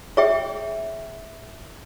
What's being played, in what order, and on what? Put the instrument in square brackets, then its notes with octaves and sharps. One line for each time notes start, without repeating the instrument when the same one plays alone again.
[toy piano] G#4 C#5 E5 G5